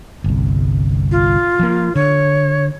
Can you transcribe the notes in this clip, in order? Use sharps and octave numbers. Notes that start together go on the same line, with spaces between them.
G1 C2
F4
F3 F#3 A#3
D3 C#5